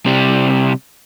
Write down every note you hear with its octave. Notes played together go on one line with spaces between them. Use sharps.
C3 G3